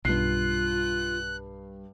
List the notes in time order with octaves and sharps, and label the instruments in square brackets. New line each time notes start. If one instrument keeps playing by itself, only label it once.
[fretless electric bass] B1 [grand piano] G2 C7 [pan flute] F4 [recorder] F#6